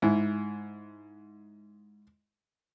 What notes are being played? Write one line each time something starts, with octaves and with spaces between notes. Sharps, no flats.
G#2 E4